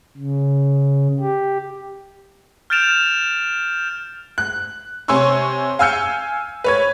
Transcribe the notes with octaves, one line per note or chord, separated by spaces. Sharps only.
C#3
G4
F6 G6 A6 D7 E7 F7
F#6
C3 C#5 G#5 C6 C#6 E6
F5 G#5 E6 F6 G6 C#7
B4 C#5 G#6